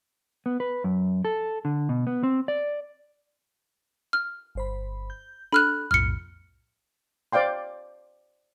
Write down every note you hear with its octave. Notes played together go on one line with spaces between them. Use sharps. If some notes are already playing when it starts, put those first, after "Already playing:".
B3
B4
F#2
A4
D3
B2
B3
C4
D5
F6
G1 C5 B5
G6
D4 A4 B5 F6 F#6
B1 F2 A2 F6 C#7
C5 D5 F5 G5 C6